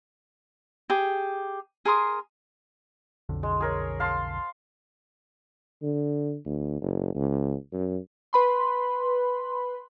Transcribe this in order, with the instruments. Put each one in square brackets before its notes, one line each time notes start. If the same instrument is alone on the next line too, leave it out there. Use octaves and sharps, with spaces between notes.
[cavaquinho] G4 G#4
G#4 A#4 C6 D#6
[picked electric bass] B1 F2 D3
[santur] G#3
G#4 A#4 C#5
F5 A5 C6
[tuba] D3
D2
F#1
C#2
F#2
[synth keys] B4 B5 C6